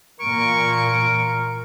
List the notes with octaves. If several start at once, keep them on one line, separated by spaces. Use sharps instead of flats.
A#2 E3 A#4 C#6 D7